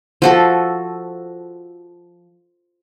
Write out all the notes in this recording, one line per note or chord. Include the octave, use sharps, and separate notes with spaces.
F3 F#4 A4